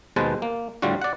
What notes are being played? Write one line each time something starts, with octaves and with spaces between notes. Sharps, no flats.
D#2 B2 G#3 B4 C5 A5
A#3
A2 D3 G3 F4 F#4
D5 F#5